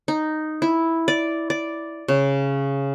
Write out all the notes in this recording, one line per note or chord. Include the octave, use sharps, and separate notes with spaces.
D#4
E4
D5
D5
C#3